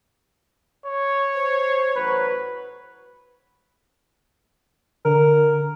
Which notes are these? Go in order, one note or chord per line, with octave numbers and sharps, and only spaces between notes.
C#5
C5
A1 F#3 B4
D3 A#4